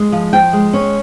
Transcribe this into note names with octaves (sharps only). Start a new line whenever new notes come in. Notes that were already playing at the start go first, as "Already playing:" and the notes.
Already playing: G#3
F3
F3 G5
G#3
C#4